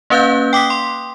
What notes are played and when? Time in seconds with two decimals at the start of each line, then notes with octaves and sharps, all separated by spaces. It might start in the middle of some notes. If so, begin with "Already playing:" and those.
0.10 A#3 C#4 B4 F5 F#6 G6
0.53 G5 D6 D#6 B6
0.70 C6